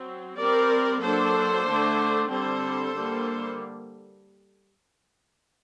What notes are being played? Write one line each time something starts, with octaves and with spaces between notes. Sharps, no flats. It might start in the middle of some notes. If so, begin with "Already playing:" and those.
Already playing: F#3 C4
G3 C4 A#4 D5
F#3 A#3 D4 A4 C5
D3 A3 D4
D3 G3 C4 A4 C5
D3 G3 A#3